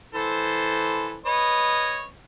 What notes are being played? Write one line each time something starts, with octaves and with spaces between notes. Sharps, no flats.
E3 A4 C5
B4 C#5 D#5